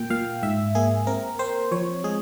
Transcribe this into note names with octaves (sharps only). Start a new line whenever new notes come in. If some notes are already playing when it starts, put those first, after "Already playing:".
Already playing: A#2 G5
A#2 F5
G#2 E5
A#3 G#4
C4 A#4
C4 C5
F3 C#5
G#3 G#4